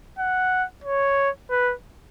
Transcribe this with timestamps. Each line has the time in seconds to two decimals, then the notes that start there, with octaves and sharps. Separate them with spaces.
0.19 F#5
0.84 C#5
1.50 B4